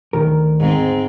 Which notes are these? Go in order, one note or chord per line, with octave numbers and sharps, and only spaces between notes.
D2 D#3 A#4
G#2 C4